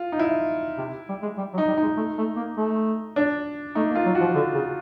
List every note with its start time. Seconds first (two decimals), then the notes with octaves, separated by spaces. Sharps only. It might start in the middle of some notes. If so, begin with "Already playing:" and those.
Already playing: F4
0.12 D#4
0.19 E4
0.78 C3
1.09 G3
1.22 G#3
1.38 G3
1.53 F#3
1.58 D#4
1.68 G3
1.78 G#3 D#4
1.97 A3
2.18 A3
2.36 A#3
2.57 A3
3.16 D4
3.75 A3 D#4
3.90 A#3
3.95 F4
4.06 F#3
4.15 F#4
4.21 F3
4.35 D3
4.55 C#3